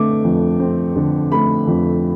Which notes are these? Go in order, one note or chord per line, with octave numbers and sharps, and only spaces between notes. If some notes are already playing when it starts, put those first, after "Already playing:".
Already playing: D3 A3 C4 D6
F2
C4
D3
A3 B5
F2